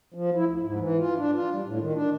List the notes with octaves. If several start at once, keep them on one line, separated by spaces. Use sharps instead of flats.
F3
E4
D2
G#2
E3
F4
D4
F4
G3
A2
D#3
D4